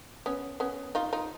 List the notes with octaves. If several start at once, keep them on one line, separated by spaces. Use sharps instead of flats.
B3 C#4
B3 C#4
D#4 F4
D#4 F4